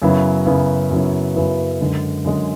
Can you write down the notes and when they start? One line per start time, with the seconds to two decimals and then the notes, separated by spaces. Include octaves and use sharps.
0.02 F#2 C#3 F#3 B3 E4
0.46 F#2 C#3 F#3 B3 E4
0.91 F#2 C#3 F#3 B3 E4
1.35 F#2 C#3 F#3 B3 E4
1.81 F#2 D3 G#3
2.24 F#2 D3 G#3